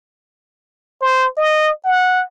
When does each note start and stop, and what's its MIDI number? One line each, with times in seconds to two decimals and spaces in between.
1.01 1.27 72
1.37 1.71 75
1.85 2.23 78